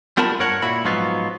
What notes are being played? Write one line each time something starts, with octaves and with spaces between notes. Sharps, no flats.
G3 B3 F4 A#4 A5 B5
G2 A#4 C#5 F#5
A#2 E4 F#4 B5
G#2 F3 F#3 B3 F4